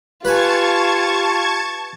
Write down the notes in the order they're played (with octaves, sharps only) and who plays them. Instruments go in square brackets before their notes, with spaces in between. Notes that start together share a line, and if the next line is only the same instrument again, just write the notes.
[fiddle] F4 [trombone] G4 [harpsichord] B4 G#5 [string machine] A5 C#6 G#6